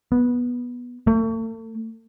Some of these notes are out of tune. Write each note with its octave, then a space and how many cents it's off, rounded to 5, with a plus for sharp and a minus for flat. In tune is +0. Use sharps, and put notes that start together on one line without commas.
B3 -15
A3 +40